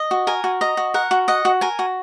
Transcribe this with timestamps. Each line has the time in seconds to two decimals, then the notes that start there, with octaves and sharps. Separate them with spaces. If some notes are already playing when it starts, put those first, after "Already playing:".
Already playing: D#5
0.11 F#4
0.27 A#4 G#5
0.44 F#4
0.61 D#5 A#5
0.77 F#4
0.94 A#4 F#5
1.11 F#4
1.28 D#5 F#5
1.45 F#4
1.61 A#4 G#5
1.79 F#4